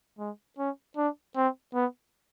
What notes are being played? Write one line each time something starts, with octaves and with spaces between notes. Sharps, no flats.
G#3
C#4
D4
C4
B3